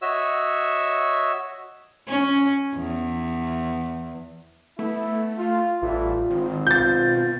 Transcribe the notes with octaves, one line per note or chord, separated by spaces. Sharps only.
F#4 C#5 D#5 E5 E6
C#4
E2
A3 B3 E4
F4
A1 A2 E3 G3 F4
G#1 D#3 C4
B2 F4 G6 A6